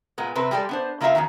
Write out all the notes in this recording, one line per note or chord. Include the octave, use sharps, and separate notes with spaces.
A#2 G#3 B3
C3 C4 B4
G3 G#3 G4 A4 D5
B3 D4 C5
C#3 A#3 F4 F#4 E5 F5
E2 G#2 B2 D#3